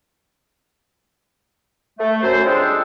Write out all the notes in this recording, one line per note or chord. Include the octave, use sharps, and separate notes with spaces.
A3
F#2 C5
G3 G#3 C4 D4 F4 A4